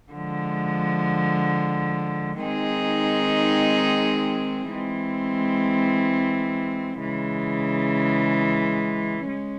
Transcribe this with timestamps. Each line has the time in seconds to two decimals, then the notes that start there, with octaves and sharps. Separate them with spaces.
0.12 D3 F3 G#3
2.41 D#3 G#3 C4 D#4 G#4
4.71 E3 G#3 C4
7.00 C#3 E3 G#3
9.28 G#3 C#4